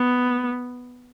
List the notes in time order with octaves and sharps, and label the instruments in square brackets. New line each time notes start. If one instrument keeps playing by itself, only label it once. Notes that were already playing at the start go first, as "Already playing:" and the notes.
Already playing: [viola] B3